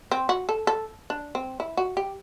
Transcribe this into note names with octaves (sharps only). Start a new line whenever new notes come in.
C4
F#4
A4
A4
D4
C4
E4
F#4
G4